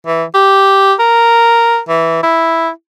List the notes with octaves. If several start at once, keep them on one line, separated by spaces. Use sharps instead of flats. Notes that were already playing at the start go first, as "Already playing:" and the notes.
E3
G4
A#4
E3
E4